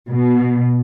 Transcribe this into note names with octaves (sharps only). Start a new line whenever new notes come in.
B2